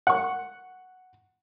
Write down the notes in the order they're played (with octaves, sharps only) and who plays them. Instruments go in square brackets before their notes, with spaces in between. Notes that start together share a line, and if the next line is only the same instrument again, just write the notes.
[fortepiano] F#5 C#6